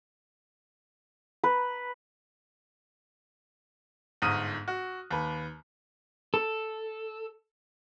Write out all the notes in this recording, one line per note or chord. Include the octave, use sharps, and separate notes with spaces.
B4
G1 G#2 D#6 F6 D#7
F#4
D#2 B4
A4